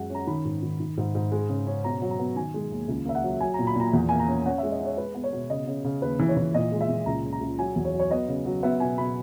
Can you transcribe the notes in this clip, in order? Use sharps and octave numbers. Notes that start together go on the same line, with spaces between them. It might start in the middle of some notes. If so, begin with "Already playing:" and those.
Already playing: F#2 G#3 F#5
C#4 A#5
D#3 B5
G#2
D#3
D#3
G#2
G#2
G#3
C#3
C#4
B2 A#5
F#3
A#5
B3
D#3 G#5
G#3
D#2
C#2
A#3 E5
F#5
F#3
F#3 G#5
A#2 A#5
B5
A#2 A#5
E2
A#3 G#5
A#5
C#4
C#4 F#5
G#3 E5
D#5
C#4 C#5
G#3 B4
B3
C#5
B2
C#3 D#5
C#3
C#3
D#2 B4
E3
C#5
E3
A#2 D#5
G#3
E5
A#2
C#2 A#5
C#3
A#5
C#2
F#3 G#5
E2
C#5
F#3
C#5
B3 D#5
C#3
F#3
B3 E5
B2 G#5
B2 B5